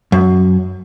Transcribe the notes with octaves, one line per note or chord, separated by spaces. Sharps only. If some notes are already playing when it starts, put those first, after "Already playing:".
F#2